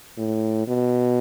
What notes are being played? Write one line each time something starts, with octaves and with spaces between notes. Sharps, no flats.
A2
B2